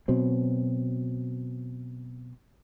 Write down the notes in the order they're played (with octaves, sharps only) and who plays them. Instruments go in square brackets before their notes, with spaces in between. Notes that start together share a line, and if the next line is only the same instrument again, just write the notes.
[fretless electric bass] B2 F#3 C4